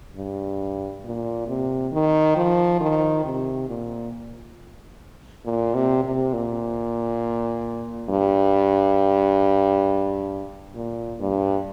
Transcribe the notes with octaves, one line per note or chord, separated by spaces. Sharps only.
G2
A#2
C3
D#3
F3
D#3
C3
A#2
A#2
C3
C3
A#2
G2
A#2
G2